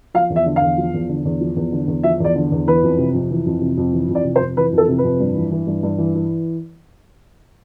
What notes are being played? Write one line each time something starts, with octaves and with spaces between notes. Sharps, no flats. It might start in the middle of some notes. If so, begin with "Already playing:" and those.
F3 F5
E2
E5
D3
F5
E2
F3
E2
D3
E2
F3
E2
D3
E2
F3 E5
E2 D5
D3
E2
E3 B4
F2
C3
F2
E3
F2
C3
F2
E3
F2
D5
C3
C5
F2
E3 B4
F2
A4
C3
B4
F2
G2
E3
E3
G2
G2
E3
E3